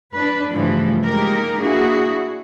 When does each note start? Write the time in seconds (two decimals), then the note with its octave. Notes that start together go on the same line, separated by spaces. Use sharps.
0.14 D4 B4
0.52 G2 C#3 E3 F3 A3
1.05 G#3 A#3 D#4 G4 A#4
1.59 A#3 D4 E4 F#4 G#4